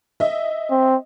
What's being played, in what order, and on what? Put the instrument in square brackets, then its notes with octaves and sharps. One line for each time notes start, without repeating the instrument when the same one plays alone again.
[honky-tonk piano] D#5 E5
[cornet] C4